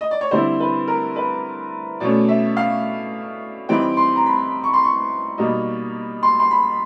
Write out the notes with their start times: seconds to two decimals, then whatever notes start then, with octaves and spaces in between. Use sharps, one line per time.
0.01 D#5
0.11 D5
0.21 C#5
0.31 D3 G3 C4 E4 C5
0.60 B4
0.87 A#4
1.16 B4
2.00 B2 F#3 A3 C#4 D5
2.28 E5
2.57 F5
3.69 E3 G3 C4 D#4 G5
3.97 C6
4.16 A#5
4.26 B5
4.64 C#6
4.73 C6
4.84 C#6
5.38 B2 G3 A#3 D#4
6.23 C6
6.40 C6
6.51 B5